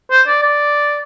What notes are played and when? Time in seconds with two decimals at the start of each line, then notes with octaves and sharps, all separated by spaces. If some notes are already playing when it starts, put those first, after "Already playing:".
0.11 C5
0.27 D5
0.42 D5